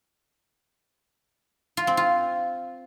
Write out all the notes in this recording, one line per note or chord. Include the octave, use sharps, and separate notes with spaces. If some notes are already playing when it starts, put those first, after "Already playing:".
F4
C4
F4